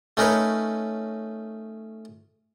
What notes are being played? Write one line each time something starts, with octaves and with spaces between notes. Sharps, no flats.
A3 C#4 D#4 A#4 B4 C#5